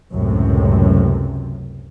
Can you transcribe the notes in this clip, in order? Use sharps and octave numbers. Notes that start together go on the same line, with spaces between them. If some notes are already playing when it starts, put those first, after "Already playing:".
C#2 F#2 A2 C3